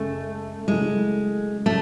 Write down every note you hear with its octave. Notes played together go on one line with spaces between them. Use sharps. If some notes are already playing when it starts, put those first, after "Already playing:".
Already playing: F#2 C#3 G#3 A3
C#3 F#3 G#3 A3 E4
C#3 A3 C#4